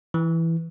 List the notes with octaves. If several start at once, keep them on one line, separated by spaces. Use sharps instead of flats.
E3